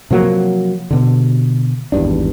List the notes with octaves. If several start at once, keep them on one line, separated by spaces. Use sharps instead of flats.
C3 F3 F#3 A#3
B2 D3
G#1 E2 G2 D4